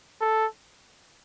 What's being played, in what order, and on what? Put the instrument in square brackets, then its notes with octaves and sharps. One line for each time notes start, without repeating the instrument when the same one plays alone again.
[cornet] A4